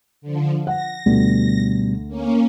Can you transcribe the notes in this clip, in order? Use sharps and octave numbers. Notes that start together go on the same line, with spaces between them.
D3 F3
F#5 A#6
D2 B2 G3 B3
A#3 C#4